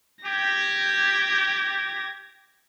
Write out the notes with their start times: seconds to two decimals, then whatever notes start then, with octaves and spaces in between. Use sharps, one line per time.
0.25 G4 G#6 A#6